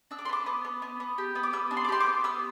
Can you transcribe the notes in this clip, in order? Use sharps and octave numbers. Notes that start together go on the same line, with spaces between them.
D4 E6
D6
C6
B3 D6
B3
B3
B3
B3
G4
B3
D6
B3 E6
D4
C6
D6
G4 C6
D6
B3
B3 E6